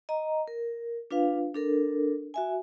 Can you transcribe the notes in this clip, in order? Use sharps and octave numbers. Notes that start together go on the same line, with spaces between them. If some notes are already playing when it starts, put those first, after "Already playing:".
D#5 A#5
A#4
D4 F4 B4 F5
D4 A4 A#4
F#4 E5 G#5